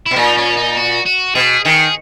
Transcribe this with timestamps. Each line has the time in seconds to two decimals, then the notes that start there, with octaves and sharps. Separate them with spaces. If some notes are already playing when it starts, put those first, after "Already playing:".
0.06 B2 E4
0.16 A#2 D#4
0.37 C#4
0.56 D#4
0.76 F#4
1.06 F#4
1.35 B2 G#4
1.65 D#3 G#4